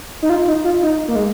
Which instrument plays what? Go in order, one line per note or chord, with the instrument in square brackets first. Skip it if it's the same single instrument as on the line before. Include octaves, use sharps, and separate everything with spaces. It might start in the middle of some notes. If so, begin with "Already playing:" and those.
[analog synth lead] D#4
F4
D#4
F4
D#4
A#3
G#3